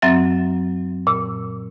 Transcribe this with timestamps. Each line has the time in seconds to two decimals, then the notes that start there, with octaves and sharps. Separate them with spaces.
0.02 F#2 F#3 C4 E5 A6
1.07 A#2 E6